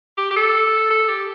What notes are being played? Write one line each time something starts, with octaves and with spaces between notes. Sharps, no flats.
G4
G4
A4
A4
G4